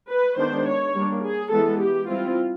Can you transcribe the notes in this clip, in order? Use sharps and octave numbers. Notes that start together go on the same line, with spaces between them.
B4
D#3 G#3 B3 D4 C5
C#5
G3 A#3 D4
G#4
E3 G#3 B3 A4
G4
G3 C4 E4 F4